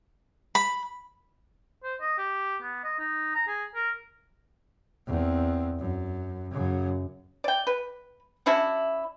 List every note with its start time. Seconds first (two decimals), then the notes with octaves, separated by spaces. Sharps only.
0.55 B5
1.84 C5
2.01 D#5
2.18 G4
2.62 B3
2.84 D#5
2.99 D#4
3.35 A#5
3.47 G#4
3.75 A#4
5.07 E2 C4
5.79 F#2
6.51 F#2 C#3
7.44 D5 G5
7.67 B4
8.46 C#4 D4 E4 F#4